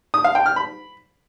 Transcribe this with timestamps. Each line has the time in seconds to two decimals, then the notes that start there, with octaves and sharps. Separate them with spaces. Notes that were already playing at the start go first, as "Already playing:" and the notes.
0.14 D#6
0.24 F5
0.35 G5
0.46 F6
0.56 B5